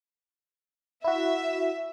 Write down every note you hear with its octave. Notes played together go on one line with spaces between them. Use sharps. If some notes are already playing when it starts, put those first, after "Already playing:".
E4 F#4 E5